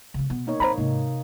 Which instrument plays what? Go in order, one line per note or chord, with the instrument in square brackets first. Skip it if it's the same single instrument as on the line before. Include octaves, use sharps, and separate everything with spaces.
[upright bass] C#3 A3
B2 B3
[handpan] A#3 D#4 C#5
[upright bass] E3 C4 [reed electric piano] C5 A#5 B5
[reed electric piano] G#2 [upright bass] C3 [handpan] A#3 D#4